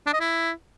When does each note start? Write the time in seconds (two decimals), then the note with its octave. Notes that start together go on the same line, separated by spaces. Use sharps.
0.07 D4
0.14 D#5
0.21 E4